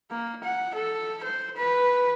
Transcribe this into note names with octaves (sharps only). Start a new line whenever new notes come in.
A#3
F#5
A4
C5
B4